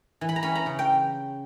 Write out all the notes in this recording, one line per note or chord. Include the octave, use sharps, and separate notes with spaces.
E3
B5
A#5
C#4 B5
A#5
C#3
G5